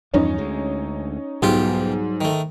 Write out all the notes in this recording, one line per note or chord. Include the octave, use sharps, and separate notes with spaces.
E2 G2 F3 C#4 D#4
D2 G#3
B1 G#2 F#3 G3 F4 G4
D#3 A3